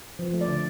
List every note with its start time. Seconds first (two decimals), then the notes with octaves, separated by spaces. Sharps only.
0.19 F3
0.34 A3
0.41 D5
0.48 D3